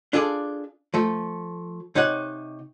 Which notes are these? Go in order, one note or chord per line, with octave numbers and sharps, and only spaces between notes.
D4 F4 G#4 A4 D5
F3 A3
C3 D#4 C#5 F#5